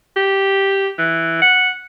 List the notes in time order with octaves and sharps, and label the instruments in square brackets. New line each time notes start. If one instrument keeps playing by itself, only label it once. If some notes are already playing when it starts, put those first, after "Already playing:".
[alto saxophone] G4
E3
F#5